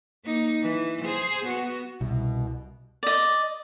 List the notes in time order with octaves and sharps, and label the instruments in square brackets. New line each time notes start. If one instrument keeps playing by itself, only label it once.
[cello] A#3 D#4
E3
G#4 C5
B3 F#4
[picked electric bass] C2 [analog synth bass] B2
[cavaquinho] D5 D#5